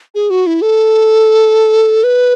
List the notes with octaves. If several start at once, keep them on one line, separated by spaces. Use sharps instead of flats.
G#4
F#4
E4
A4
B4